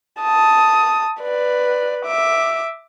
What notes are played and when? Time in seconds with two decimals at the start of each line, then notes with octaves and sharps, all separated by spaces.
0.21 A5 D#6
1.22 B4 D5
2.05 E5 D6